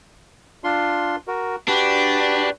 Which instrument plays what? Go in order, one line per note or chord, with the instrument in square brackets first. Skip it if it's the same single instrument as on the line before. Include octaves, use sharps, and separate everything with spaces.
[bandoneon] D4 F4 C6
F#4 A#4
[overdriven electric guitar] D4 [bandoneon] F#4 G4 B4